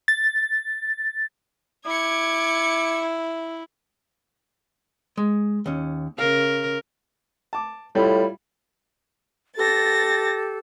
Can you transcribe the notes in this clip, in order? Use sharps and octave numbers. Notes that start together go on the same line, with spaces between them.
A6
E4 D6 G#6 C#7
G#3
D#2 C#4
C#3 A#4 F5
A5 D6
A2 G3 E4 F4
G4 A4 A6 A#6